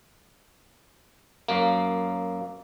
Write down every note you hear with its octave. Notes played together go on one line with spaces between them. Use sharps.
F#2 A#3